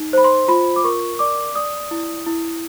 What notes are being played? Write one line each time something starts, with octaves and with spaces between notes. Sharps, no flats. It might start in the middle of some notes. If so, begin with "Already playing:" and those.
Already playing: D#4
C5 B5
C6
F4 B5
D6
A#4 C#6
D5 D6
D5 D#6
E4
E4